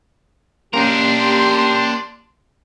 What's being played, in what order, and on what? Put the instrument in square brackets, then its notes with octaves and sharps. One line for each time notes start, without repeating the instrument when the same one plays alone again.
[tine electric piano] A#3 C#4 C7 [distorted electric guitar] D4 A#4 [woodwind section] G4 [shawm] C6